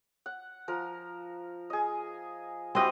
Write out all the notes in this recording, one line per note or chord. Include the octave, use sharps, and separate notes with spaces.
F#5
F3 A#4
G#4 D#5
C4 E4 F#4 G4 D#5